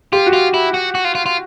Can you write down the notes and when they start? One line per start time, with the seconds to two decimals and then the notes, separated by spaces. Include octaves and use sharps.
0.12 F4 G4
0.26 F#4
0.33 F4
0.54 E4
0.74 F#4
0.95 F#4
1.05 F4
1.15 F4
1.26 F4